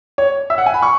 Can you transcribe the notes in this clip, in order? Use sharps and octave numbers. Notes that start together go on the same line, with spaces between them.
C#5
E5
F#5
G#5
B5
C#6